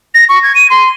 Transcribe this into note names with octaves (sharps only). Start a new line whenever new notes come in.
A#6
C#6
G#6
D#7
C6